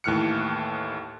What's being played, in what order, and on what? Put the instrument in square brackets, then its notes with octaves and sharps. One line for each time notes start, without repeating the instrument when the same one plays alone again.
[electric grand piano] D#2 A2 E3 F6 F#6 C#7